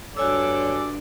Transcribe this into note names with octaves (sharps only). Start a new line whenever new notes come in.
G2 D4 F#4 A4 C#5 D5 G#5 E6